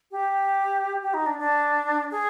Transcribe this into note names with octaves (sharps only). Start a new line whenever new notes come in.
G4
G4
D#4
D4
D4
G#4